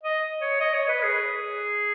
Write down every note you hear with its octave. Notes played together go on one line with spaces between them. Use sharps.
D#5
C#5
D#5
C#5
B4
G#4